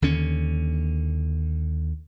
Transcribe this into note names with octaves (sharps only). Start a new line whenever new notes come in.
D#2 D3 C#4